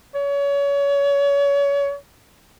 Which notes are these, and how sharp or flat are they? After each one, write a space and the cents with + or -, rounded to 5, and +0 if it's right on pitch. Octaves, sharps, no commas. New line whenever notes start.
C#5 +30